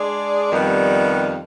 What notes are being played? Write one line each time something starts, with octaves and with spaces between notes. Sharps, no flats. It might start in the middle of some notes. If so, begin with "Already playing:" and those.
Already playing: G#3 D4 G#4 D5
F2 D#3 G3 B3